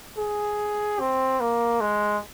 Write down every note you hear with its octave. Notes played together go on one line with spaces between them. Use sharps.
G#4
C4
A#3
G#3